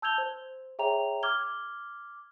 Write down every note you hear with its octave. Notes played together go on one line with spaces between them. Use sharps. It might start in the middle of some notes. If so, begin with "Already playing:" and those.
A5 E6 G6 G#6 F7 G7
C5
G#4 C#5 E5 G5 A#5 F7
D6 F6 G#6 G7